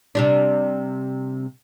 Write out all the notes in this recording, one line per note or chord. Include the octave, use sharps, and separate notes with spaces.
C3 G3 D4